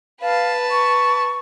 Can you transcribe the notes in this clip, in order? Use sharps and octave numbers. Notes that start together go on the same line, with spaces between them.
B4 F5 A5
C#6